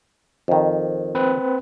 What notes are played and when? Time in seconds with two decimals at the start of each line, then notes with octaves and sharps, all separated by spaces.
0.48 F2 D#3
1.15 C4 B4 C5